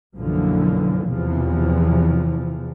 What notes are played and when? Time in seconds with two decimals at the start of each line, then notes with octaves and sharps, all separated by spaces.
0.18 B1 F#2 D3 E3 F3 A#3
1.09 E2 C3 E3 F3